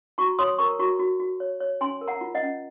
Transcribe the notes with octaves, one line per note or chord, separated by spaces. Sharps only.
F#4 A#5 C#6
C#5 C6 D#6
A#4 A#5 C#6
F#4 A#5 C#6
F#4
F#4
C#5
C#5
C#4 G#5 C6
A#4
F#5 A#5
F4
D#5 F#5
C#4